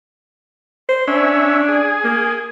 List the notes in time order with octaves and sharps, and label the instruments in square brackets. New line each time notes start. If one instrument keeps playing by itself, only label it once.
[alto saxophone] C5
[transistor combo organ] C#4 E5 [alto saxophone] D4
[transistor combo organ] G#4
[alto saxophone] A#3